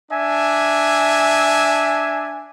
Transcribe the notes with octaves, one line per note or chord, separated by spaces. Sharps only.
D4 E5 G#5